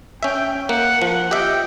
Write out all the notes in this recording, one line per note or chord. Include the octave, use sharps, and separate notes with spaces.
C#4 E5 G5
A#3 F#5
F3 F#5
G4 D#5 E5 G5